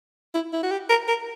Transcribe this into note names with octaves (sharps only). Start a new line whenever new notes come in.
E4
E4
F#4
G4
A#4
A#4